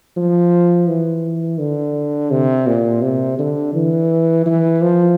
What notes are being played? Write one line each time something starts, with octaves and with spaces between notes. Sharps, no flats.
F3
E3
D3
C3
A#2
C3
D3
E3
E3
F3